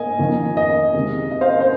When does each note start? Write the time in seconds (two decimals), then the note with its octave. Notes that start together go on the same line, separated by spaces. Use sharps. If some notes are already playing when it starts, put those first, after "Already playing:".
Already playing: D#5 G#5
0.19 F2 D#3 A#3
0.57 D#5
0.94 C3 D#3 G#3 C4
1.31 D#5
1.41 C5 F5
1.50 D#5
1.60 C5